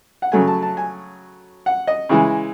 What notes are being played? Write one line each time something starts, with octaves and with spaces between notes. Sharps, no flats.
F#5
C#3 F#3 A3 G#5
A5
A5
G#5
F#5
D#5
C#3 E3 G#3